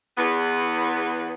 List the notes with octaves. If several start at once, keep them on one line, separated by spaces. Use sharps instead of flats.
E2 B3